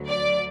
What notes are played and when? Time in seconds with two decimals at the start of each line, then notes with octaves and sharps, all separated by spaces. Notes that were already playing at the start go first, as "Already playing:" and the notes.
Already playing: D2 D3 F#3
0.09 D5